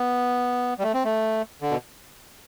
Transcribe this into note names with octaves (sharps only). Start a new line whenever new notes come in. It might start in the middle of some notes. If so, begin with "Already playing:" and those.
Already playing: B3
G3
A3
C4
A3
D3
B2